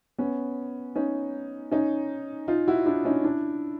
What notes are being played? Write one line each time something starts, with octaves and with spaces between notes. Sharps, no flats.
B3 C#4
C#4 D#4
C#4 D#4
D#4 F4
E4 F#4
D4 E4
C#4 D#4
D4 E4